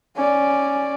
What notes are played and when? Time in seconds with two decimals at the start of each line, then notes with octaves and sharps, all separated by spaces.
0.15 C#4 D5